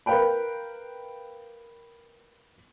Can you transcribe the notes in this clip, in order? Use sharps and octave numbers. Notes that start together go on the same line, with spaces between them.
A#4 B4 F5 G5 B5